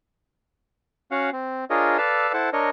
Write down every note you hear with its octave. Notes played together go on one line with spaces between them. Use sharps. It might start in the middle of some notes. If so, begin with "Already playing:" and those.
C#4 F#4 F5 F#5
C4
D4 F4 G#4 A#4 C#5 D#5
A4 B4 D5 F5 E6
E4 A4 C5 F#5
D4 A#4 C#5 D#5